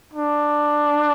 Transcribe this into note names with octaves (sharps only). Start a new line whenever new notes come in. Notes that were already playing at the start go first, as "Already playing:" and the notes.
D4